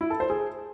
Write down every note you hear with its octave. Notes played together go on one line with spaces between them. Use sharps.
E4
A4
C5
G#4